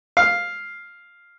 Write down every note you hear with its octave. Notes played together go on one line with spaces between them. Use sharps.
F5